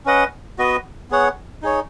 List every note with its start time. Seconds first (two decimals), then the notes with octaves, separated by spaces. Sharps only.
0.06 C#4 B4 D#5 F#5
0.58 B3 F#4 B4 D#5
1.11 B3 G#4 C#5 F#5
1.63 D#4 G#4 C#5